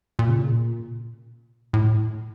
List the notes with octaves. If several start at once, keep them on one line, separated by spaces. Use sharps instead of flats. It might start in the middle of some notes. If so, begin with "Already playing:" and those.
A#2
C#3
A#2
A2